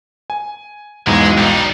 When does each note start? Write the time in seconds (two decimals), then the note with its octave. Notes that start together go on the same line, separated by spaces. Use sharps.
0.30 G#5
1.07 B1 E2 G#2 G#3
1.38 G3 D#4